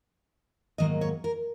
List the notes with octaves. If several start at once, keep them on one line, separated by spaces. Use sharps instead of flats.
G#2 D#3 F#3 A#3 D#5
C#5
A#4